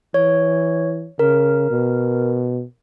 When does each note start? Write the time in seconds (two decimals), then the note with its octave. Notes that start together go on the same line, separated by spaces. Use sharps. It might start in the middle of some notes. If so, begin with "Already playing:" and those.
0.14 E3 C#5
1.19 C#3 A#4
1.70 B2